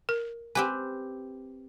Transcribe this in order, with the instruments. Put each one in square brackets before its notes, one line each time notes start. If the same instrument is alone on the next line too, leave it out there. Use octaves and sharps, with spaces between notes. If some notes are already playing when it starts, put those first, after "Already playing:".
[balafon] A#4
[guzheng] C4 G4 B4 [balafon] G#5